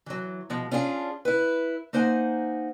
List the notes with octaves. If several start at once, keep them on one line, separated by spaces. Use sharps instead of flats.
E3 F#3
B2 F3 G#3
C#4 D4 F4 G4 G#4
E4 B4
A#3 D#4 C5 F#5 G#5